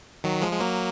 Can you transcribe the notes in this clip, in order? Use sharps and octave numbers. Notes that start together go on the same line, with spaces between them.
D#3 F#3
F3 G#3
G#3
F#3 A#3